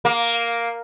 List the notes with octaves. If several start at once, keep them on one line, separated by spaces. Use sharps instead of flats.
A#3